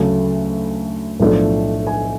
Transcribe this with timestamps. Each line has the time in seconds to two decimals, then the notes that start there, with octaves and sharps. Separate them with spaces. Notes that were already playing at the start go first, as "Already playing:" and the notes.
Already playing: D2 C#3 F#3 A3 A5
1.20 B1 A2 F3 A3 D4
1.87 G#5